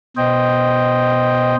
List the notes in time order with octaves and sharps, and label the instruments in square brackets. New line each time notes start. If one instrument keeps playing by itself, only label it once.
[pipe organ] B2 C5 D#5 G5